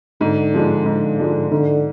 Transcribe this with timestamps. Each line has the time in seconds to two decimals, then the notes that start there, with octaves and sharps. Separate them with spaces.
0.21 G#2 D3
0.54 F3 G#3 D4
0.86 G#2
1.19 F3 G#3 D4
1.52 G#2 D3